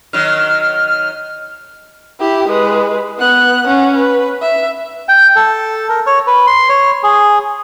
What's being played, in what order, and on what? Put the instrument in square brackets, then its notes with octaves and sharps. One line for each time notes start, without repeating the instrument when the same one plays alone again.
[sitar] D#3 F#3 [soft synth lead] F6
[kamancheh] E4 G4
G#3 B4
B3 F#6
C#4 F#5
B4
E5
[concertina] G5
A4
A#4
C#5
B4
C6
C#5
G#4